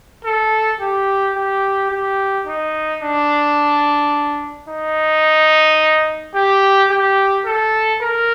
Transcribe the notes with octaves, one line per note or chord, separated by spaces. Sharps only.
A4
G4
G4
G4
D#4
D4
D#4
G4
G4
A4
A#4